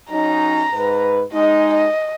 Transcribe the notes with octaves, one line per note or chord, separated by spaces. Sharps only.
F#3 C#4 D#4 A#5
G#2 B4
G#3 D#4 D#5
D#5